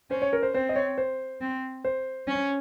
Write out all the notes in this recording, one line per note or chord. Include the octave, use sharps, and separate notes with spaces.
C#4 C5
C#5
A#4
C5
C4 C5
D#5
C#5
C5
C4
C5
C#4